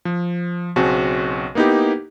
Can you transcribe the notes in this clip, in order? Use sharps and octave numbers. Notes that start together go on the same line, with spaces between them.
F3
B1 C#3 C4 F#4 A5
A#3 B3 D#4 E4 G4